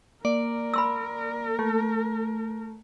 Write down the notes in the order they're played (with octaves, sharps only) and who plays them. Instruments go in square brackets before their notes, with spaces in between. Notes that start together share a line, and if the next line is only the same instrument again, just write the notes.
[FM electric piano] A#3 [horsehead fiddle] A#4 [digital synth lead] D5
[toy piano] B5 C6 E6
[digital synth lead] A3